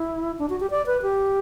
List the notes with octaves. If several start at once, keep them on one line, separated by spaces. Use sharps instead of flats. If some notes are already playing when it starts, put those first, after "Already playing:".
Already playing: E4
D4
F#4
G4
D5
B4
G4